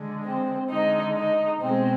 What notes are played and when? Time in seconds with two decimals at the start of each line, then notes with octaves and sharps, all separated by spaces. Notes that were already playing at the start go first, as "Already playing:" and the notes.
Already playing: D3 G#3
0.24 C4
0.69 D3 G#3 D#4
1.15 D#4
1.60 B2 G#3 C4